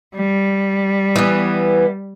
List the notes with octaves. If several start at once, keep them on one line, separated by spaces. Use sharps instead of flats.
G3
E3 B3